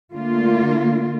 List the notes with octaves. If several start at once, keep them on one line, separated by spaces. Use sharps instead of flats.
D3 A3 A#3 F4